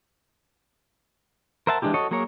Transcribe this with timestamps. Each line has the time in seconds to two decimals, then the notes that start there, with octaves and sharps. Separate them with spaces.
1.67 A#4 C5 E5 F#5 A5
1.82 E3 G#3 D4 E4 G4
1.94 F#4 A4 C#5 D#5
2.11 F#3 A#3 G#4 A#4 C#5